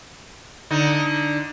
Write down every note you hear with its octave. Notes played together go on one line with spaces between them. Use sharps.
D3 D#4